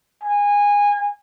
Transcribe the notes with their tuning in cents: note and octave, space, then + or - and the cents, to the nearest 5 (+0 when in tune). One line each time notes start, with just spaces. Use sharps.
G#5 -20